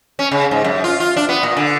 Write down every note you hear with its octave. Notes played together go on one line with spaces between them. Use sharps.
C#4
C#3
G#2
F#2
F4
F4
D4
B3
A#2
D3